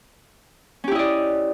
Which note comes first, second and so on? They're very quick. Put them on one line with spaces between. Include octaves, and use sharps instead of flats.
C#4 G4 E4 D#5 D5